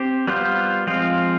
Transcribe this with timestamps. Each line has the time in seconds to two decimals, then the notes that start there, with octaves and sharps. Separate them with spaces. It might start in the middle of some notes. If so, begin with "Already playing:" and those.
Already playing: C4 G4 C5
0.27 G3 B3 F4 C5
0.87 F3 G#3 C4 F4